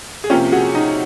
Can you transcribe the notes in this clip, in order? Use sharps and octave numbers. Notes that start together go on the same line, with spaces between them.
G#4
C3 F3 A#3 C#4 F4 G4
F#4 G#4
D#4